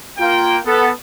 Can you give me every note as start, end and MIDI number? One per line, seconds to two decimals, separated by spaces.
0.18 0.58 58
0.18 0.58 65
0.18 0.58 79
0.65 0.88 59
0.65 0.88 69